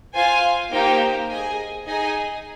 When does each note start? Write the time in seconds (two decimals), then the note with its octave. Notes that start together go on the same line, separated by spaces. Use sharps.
0.14 F4 C5 F5 G#5
0.71 A#3 D#4 G4 C5 G5
1.29 G#4 D#5 G#5
1.86 D#4 G#4 D#5 G#5